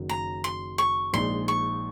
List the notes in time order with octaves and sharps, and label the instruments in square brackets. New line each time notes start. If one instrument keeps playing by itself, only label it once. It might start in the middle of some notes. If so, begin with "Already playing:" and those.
Already playing: [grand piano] F#1 F#2 D#3 F#3
[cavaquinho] A#5
C6
C#6
[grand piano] A#1 A#2 G#3 D#4 [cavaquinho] C6
[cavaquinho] C#6